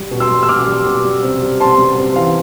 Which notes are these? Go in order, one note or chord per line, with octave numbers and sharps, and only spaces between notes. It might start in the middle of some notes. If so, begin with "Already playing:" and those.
Already playing: G3
B2
C6 E6
G3
E6
B2 D6 F6
G3
B2
G3
C3
G3
C3 A5 C6
G3
C3
E3 F5